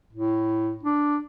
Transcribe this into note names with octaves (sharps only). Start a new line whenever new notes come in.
A2
D4